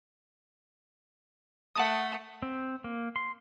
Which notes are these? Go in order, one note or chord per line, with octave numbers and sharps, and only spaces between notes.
A3 F#5 A5 D#6
C4
A#3
C6